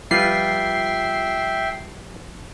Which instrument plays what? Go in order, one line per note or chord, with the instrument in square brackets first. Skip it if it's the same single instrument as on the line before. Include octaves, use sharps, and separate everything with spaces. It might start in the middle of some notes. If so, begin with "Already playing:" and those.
[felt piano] F3 [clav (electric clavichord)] G3 F4 B4 [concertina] E5 G5 [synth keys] C7